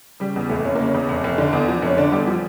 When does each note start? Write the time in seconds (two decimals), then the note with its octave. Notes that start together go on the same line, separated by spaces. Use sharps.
0.20 C#3 G3
0.36 E2
0.49 F1 A3
0.65 F1 C#4
0.75 C#3 A#3
0.86 C#4
0.94 E2
1.09 F1
1.24 F1
1.38 D3 D4
1.53 E2
1.68 F3
1.82 F1 C#4
1.97 D3 D4
2.12 E2 G3
2.26 F3 G3